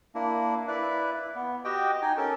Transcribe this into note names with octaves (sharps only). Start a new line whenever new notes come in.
A#3 D4 E4
E4 B4 D5 E5
B3
F#4 G4 D#5 G5
D#4 G5 G#5
C#4 A4 A#4 A5